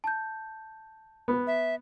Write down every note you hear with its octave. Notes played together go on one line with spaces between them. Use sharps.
A5 G6
B3
E5